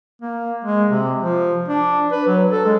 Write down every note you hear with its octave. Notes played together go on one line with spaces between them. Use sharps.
A#3
G#3
C3
F3
D4
B4
F#3
A4
G#3